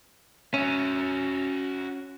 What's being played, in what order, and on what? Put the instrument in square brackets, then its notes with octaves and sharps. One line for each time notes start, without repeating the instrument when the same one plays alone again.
[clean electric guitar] C#4 [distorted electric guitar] F#4 E5